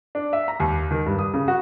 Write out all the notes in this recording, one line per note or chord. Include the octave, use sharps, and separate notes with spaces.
D4
E5
A#5
D#2
D#3
G2
D#6
C#3
F#4